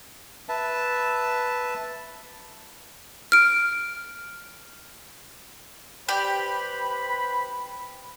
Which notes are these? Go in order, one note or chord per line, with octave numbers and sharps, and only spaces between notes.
B4 E5 A5
F6 D7
G4 B4 C5 D5 B5